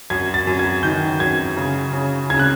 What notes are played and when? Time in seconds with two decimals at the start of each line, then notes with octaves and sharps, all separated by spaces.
0.10 F#2 G#6
0.34 A6
0.47 F#2
0.59 G#6
0.83 D#3 G6
1.20 F#2 G#6
1.57 C#3
1.93 C#3
2.30 C#3 G#6
2.39 F#6